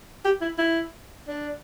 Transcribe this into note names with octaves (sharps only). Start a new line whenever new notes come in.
G4
E4
E4
D4